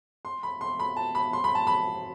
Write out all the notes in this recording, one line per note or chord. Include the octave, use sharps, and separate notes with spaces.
C6
B5
C6
B5
A5
B5
C6
B5
A5
B5